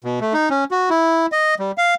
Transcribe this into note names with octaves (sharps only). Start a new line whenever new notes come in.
B2
A3
D#4
C#4
F#4
E4
D#5
G3
F5